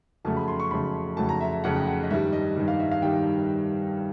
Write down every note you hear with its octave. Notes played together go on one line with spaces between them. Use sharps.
F2 C#3 F#3 A3 A5
B5
C6
C#6
F2 C#3 F#3 A3 B5
F2 C#3 F#3 A3 A5
A#5
E5
E5
F2 C#3 F#3 A3 F#5
G5
F#5
D#5
G2 D#3 G3 E5
D#5
G2 D#3 G3
F5
E5
F5
D#3 G3 G5